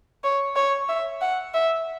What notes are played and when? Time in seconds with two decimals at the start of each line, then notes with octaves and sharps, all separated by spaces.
0.24 C#5
0.56 C#5
0.89 E5
1.21 F#5
1.54 E5